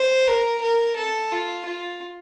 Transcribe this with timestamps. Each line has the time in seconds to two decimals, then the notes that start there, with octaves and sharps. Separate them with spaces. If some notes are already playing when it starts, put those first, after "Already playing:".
Already playing: C5
0.28 A#4
0.62 A#4
0.96 A4
1.32 F4
1.66 F4